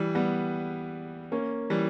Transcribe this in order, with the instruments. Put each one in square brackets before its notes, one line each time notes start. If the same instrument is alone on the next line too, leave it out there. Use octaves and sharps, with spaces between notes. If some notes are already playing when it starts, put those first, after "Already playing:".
Already playing: [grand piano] E3 G3
G3 B3
A#3 C#4
E3 G3